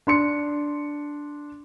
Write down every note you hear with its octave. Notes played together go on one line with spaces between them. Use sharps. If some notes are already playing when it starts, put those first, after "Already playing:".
D4 C6 C#7